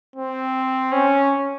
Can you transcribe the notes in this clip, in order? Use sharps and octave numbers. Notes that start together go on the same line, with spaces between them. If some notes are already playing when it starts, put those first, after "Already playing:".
C4
C#4